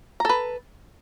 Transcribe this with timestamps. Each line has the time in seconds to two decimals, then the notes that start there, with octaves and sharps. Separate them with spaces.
0.20 A#5
0.25 A4
0.29 B4